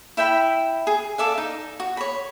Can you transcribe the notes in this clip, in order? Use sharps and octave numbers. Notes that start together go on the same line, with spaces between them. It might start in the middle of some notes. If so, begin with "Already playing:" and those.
E4 E5 G5 B5
G#4
A4 D5 E5 F5
D#4
F#4
C#5 B5